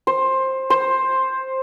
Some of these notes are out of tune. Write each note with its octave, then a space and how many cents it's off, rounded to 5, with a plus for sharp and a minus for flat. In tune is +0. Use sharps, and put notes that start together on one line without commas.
C5 +15
C5 +10